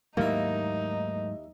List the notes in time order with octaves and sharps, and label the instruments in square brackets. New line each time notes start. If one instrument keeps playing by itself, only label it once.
[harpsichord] D#2 E4 [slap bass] G#2 F#3 A3 [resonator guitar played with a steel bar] A#3 [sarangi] D#4